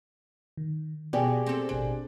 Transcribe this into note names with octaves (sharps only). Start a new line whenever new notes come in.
D#3
B2 B3 G4 G#4 D5
C4 A4
A1 B2 D4 G#5